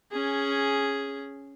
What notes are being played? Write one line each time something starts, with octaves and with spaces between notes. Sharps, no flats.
C#4 G#4